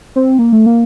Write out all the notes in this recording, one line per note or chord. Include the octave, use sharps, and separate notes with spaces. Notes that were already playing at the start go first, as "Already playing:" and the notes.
C4
A#3
A3
A#3